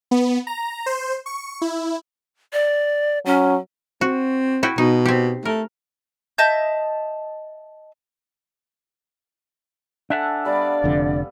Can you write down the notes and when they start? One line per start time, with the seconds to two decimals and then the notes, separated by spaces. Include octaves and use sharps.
0.11 B3
0.47 A#5
0.86 C5
1.26 C#6
1.61 E4
2.53 D5
3.26 F#3 C#4
4.01 C4 F#4
4.63 E4 F#4 G5
4.78 B2 D#4
5.06 C4 G4
5.45 A3 A#4
6.38 D#5 E5 A5 G6
10.10 D4 A4 E5 F#5 G#5 A5
10.45 G3 B3 D5 F5
10.84 F1 F2 D3